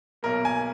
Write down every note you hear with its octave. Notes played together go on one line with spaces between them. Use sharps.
B1 B2 A#3 A#4
G#5